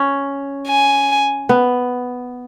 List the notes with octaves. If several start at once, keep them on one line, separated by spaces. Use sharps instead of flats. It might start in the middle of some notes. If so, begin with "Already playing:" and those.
Already playing: C#4
G#5
B3